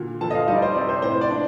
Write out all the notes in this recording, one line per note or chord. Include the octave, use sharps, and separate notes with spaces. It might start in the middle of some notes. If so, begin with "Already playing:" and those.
Already playing: A#2 D3
F3 A4 A5
D#5
F4 F5
G3 D#4 D#5
D5
C5
C3 D5
C5
A2 C5
D5
D4